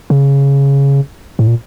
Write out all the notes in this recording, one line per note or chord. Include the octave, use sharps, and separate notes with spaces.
C#3
A2
A#2